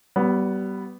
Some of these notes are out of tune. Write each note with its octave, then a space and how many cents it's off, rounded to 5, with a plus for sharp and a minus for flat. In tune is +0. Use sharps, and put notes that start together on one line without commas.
G3 -25 B3 +0